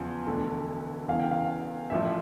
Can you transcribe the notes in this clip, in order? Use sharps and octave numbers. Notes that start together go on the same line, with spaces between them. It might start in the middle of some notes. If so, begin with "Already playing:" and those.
Already playing: E2 C#3 F3
E1 D2 D3
E2 C#3 E3 F5
G5
F5
A1 A2 F3 E5